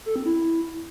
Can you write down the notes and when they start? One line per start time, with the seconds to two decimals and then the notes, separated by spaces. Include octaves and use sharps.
0.06 A4
0.16 C4
0.25 E4